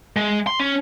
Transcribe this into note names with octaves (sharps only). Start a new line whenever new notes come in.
G#3
C6
C#4